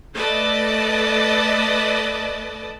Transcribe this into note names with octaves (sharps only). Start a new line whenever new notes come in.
A3 B4 D5 D#5 A5